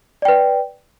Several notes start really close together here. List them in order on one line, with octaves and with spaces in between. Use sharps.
D5 G5 B4